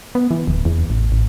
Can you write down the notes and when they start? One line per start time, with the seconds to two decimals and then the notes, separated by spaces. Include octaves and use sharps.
0.15 B3
0.31 E3
0.47 D1
0.65 E2
0.90 A1
1.12 A1